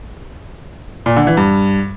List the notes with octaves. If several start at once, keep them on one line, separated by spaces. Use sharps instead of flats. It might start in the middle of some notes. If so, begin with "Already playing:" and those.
A#2
D3
E3
G2